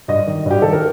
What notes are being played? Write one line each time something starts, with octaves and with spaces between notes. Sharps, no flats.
G2 D#5
D#3
G2 G4
D#3 A4
A#4